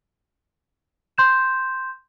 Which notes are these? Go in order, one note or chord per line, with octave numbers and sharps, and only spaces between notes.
C6 G6 E7